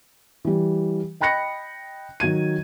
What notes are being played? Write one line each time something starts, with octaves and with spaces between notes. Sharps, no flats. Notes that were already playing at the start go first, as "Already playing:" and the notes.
E3 G3
D#5 G5 B5 F#6 A#6 C#7
D#3 F#3 G#6 D#7